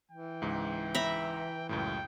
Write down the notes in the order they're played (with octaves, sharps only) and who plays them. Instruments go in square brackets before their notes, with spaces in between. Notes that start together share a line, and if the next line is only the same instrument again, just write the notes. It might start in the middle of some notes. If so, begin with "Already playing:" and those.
[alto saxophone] E3 [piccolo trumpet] G5
[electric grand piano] C#2 G#2
[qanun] E5 A#5 B5
[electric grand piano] C#2 F#2 A2 [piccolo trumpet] G5